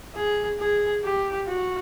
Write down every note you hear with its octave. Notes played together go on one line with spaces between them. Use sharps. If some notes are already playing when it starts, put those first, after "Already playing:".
G#4
G#4
G4
F#4